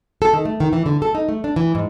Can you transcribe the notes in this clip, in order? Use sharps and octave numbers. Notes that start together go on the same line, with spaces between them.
A4
D#3
A3
D#3
E3
D3
A4
D#4
A3
D4
E3
G#2